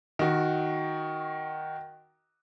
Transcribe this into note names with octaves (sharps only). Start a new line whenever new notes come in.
D#3 F#4